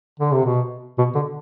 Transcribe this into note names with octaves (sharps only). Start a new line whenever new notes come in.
D3
C3
B2
B2
D3